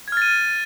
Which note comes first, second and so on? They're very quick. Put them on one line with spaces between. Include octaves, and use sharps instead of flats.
G#6 F6 A6 D#7